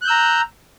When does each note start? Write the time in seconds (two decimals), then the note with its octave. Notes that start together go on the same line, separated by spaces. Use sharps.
0.02 F#6
0.05 G6
0.07 E6
0.10 A#5